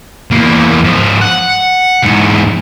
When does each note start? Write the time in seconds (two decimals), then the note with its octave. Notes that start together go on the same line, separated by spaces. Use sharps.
0.31 E2 A#3
0.85 G#2 F3
1.22 F#5
2.04 E2 G#2